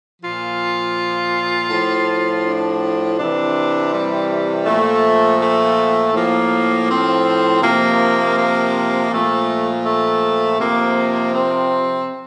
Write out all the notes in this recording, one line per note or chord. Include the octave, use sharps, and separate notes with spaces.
A#2 F3 F4
A2 F3
D4
C3 E3 D4
G3
A#2 F3 A3
A3
A2 F3 A#3
C4
C3 F3 A#3
A#3
A#2 F3 A3
A3
C3 F3 A#3
C4